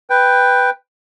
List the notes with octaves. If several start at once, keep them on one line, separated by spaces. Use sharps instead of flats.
B4 G5